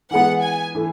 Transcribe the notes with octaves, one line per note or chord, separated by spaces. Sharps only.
E3 G#3 B3 F#5
G#5
E3 A3